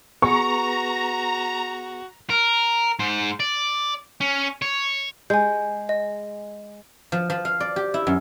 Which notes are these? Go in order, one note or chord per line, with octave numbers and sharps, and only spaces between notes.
B3 F#4 G#4 B4 A#5 C#6
A#4
G#2 C5
D5
C#4
C#5
G#3 G#5 G6
D#5
F3
F3
F5
D5
G4
E4
F#2